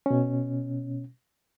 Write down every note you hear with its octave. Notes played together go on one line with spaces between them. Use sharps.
B2 C#4